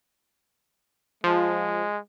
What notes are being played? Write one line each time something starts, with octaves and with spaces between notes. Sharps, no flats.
F3 G#3